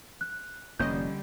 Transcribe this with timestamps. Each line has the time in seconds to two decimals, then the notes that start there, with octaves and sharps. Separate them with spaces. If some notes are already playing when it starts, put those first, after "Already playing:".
0.21 F#6
0.79 F1 D3 G3 A#3 C#4 D#5 G6